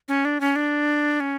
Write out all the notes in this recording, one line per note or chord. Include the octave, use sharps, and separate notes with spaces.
C#4
D4
C#4
D4
C#4